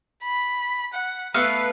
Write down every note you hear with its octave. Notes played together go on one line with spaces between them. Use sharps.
B5
F#5
A3 B3 B4 F5